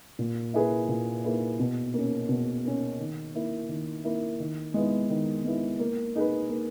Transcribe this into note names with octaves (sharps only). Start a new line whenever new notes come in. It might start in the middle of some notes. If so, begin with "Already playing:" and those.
A#2
A#3 E4 G#4 B4
A#2
A#3 E4 G#4 B4
B2
A#3 C#4
B2
A#3 C#4
D#3
A#3 E4
D#3
A#3 E4
D#3
G#3 B3 E4
D#3
G#3 B3 E4
A#3
D#4 G#4 B4
A#3